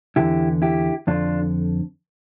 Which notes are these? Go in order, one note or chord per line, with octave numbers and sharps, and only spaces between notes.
E2 D3 E4 G4
E4 G4
F2 D3 D4 F4